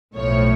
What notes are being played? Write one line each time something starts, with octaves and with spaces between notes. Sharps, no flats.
B1 A2 F3 A3 C#5